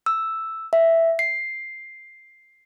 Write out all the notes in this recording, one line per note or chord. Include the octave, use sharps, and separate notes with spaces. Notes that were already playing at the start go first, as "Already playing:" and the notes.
E6
E5
C7